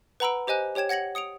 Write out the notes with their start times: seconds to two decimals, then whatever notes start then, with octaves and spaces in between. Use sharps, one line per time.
0.20 B4 F#5 A#5 B5 E6 D7
0.47 G4 C5 D#5 G#5 F#6
0.75 G4 C#5 G5 G#6 E7
0.89 F#5 G#6 A#6 C#7 F#7
1.15 D#6 C#7 D7 F7